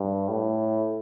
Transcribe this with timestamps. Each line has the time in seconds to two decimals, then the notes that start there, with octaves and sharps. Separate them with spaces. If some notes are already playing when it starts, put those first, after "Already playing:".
Already playing: G2
0.29 A2